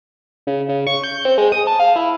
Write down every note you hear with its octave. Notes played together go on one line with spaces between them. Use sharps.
C#3
C#3
C#6
G6
C4
G#3
D#6
A5
F5
E4